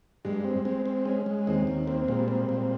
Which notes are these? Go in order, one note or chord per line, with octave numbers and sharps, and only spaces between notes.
G2 G#3
C4
G#3 C4
C4
G#3 C#4
G#3
D#2 C4
D#2
A#3 C4
A#2 G#3
G3
C4
A#2